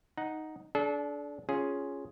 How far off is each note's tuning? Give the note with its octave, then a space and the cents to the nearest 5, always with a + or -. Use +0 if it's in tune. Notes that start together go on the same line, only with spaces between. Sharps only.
D#4 +0 F#5 +0
D4 -15 A4 -45
C#4 +0 F4 +0 G#4 +0